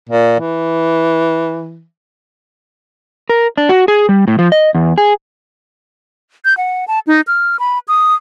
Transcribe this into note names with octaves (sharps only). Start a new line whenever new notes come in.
A#2
E3
A#4
D4
F#4
G#4
G3
A2
F3
D#5
E2
G#4
G6
F#5
A5
D#4
F6
B5
D#6